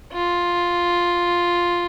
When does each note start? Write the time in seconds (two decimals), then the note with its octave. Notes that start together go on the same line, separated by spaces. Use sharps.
0.13 F4